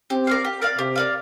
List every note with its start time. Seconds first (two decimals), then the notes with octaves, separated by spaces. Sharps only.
0.10 C4 G4
0.27 A#4 D5 F5
0.44 G4
0.62 A#4 D5 F5
0.78 C3 G4
0.96 A#4 D5 F5